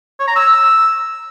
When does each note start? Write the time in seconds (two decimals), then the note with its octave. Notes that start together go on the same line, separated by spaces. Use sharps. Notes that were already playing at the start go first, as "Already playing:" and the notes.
0.19 C#5
0.28 A#5
0.36 E6